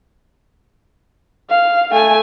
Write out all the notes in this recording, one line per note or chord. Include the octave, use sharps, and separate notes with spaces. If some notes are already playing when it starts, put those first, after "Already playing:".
F5
A3 G#5